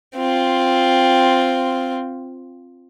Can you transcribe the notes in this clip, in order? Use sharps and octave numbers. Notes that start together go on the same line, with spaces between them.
C4 F4